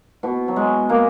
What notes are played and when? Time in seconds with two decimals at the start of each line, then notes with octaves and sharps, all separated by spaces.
0.23 B2
0.48 F#3
0.56 G#3
0.89 A#3